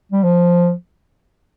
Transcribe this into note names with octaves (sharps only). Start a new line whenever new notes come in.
G3
F3